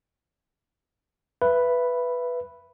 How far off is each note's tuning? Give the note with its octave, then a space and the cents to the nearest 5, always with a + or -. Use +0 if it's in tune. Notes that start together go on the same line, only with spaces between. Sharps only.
B4 +0 E5 +25 B5 +0